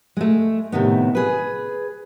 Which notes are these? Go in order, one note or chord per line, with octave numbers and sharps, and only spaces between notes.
G#3 A3
A2 C3 D#3 B3
G#4 B4